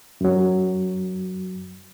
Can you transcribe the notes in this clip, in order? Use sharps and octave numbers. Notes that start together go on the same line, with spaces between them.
F#2 F#3